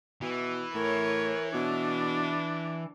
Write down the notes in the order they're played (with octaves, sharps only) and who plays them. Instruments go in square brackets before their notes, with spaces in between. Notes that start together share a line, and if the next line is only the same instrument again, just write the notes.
[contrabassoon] B2 [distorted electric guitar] E3
[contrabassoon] A2 [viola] A#4 C#5
[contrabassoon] B2 [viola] D4